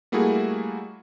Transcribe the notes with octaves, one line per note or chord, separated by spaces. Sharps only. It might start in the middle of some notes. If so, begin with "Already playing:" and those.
G3 A3 A#3 E4 F#4 G#4